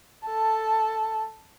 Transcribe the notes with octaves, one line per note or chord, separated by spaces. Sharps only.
A4 A5